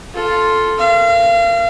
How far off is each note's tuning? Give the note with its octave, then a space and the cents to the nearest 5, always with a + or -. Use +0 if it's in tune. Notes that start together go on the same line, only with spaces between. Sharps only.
F4 +0 A4 -5
A#4 +0 F5 -35